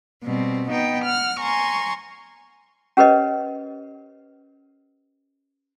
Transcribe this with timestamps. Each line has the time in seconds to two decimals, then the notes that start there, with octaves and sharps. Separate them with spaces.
0.24 B2 G3 C4
0.69 B3 D#4 G5
1.04 F#5 F6
1.40 G#5 A#5 C6 C#6
2.97 C#4 G4 A#4 B4 C#5 D#5